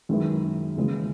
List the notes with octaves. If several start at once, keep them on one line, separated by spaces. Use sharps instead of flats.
F#2 D#3 G#3 B3 E4
D#2 C#3 E3 G#3 B3